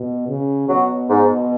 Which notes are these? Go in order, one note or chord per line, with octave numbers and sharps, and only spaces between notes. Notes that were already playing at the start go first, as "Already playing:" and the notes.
Already playing: B2
C#3
B2 F#3
G#2